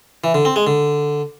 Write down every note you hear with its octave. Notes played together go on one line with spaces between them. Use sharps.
E3
D3
C4
G#3
D3